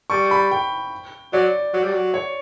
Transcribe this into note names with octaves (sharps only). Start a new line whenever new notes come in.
G3 C#6
B5
G5
F#3 D5
F#3
G3
F#3
C#5